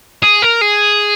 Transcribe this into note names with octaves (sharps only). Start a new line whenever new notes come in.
G#4
A#4
G#4